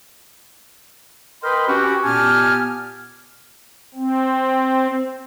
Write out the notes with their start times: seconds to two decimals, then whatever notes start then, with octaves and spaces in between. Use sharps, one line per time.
1.43 A#4 B4 D#5 G5 B5 C6
1.68 C#4 F#4 G4
2.04 A#2 B3 G4 G#5 A5 F6
3.95 C4